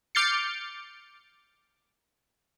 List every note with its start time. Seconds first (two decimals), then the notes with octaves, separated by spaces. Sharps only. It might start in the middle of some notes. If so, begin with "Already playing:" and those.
0.15 D6 F6 G6 A6 C7 C#7